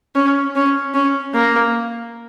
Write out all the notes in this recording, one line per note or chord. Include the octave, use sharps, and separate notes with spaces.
C#4
C#4
C#4
A#3